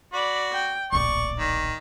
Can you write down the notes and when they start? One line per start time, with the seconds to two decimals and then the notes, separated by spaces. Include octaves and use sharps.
0.14 F#4 D5 B5
0.53 G5
0.92 D1 A#1 D5 C#6
1.39 D#3